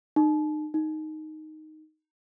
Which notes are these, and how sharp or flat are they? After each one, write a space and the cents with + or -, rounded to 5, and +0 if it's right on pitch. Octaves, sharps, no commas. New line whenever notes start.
D#4 -35
D#4 +0